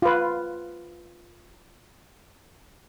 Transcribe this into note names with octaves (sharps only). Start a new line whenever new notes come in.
F4 B4